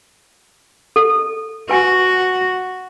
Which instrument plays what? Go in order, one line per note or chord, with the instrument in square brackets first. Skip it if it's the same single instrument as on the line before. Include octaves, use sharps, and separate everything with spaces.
[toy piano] A4
[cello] F#4 [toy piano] B4 G#5